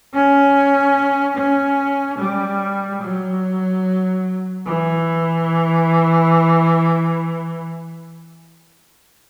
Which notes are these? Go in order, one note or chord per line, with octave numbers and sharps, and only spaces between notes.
C#4
C#4
G3
F#3
E3